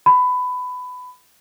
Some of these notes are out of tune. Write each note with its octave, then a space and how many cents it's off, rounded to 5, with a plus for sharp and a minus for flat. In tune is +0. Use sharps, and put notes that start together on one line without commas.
B5 +20